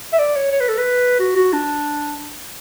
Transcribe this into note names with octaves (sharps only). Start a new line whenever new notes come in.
E5
D5
C#5
C#5
B4
A4
B4
F#4
F#4
D4